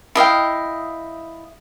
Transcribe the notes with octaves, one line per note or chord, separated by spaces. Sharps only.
E4 D#5 F5 G5